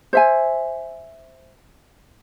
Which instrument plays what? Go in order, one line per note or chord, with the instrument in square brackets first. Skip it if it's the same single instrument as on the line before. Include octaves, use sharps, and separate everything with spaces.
[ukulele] C5 E5 G#5